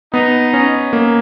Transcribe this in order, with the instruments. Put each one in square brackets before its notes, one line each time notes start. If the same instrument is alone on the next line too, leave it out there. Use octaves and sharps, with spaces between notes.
[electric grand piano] B3 [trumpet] D#4
[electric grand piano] C#4
A#3